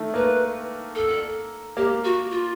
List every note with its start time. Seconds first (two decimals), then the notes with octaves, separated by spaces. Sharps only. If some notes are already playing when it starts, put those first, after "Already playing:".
Already playing: D#3 A3
0.14 A#3 B4
0.95 A4
1.77 A#3 G4
2.04 F#4
2.31 F4